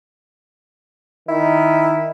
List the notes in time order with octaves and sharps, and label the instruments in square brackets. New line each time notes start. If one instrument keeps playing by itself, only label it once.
[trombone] D#3 [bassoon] E4